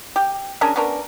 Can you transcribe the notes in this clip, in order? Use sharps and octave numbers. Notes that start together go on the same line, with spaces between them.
G4
C#4 D4 G#4 A#4
B3 C#4 D4 A#4